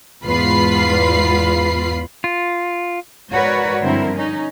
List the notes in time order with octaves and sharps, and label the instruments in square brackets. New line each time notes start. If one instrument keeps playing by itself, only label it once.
[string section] E2 G#2 F4 B4 B5 C7
[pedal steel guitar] F4
[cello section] G#2 F#4 A#4 B4 C#5 D5
G2 D3 F3 C4 E4 A#4
C#4 D#4